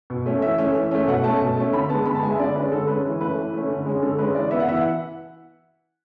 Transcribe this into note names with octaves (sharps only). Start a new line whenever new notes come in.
B2
A3 C#4
E3 E5
A3 C#4
E3
A3 C#4
B2 F#5
A3 C#4 A5
B2
A3 C#4
D3 B5
G#3 B3 A5
D3 B5
A5
G#3 B3 G#5
E5
D3 D5
G#3 C#4 B4
D3 A4
G#3 C#4 B4
E3
A3 C#4 B4
E3
A3 C#4
D3
G#3 C#4
D3 A4
G#3 C#4 B4
E3 D5
B3 E5
F#5
E3 E5
F#5